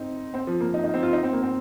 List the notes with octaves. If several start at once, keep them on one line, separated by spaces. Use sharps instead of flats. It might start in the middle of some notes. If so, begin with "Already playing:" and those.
Already playing: C4 D#4
C4
F3
A#3
D#4
D#4
C4
F4
D#4
C4
A#3
C4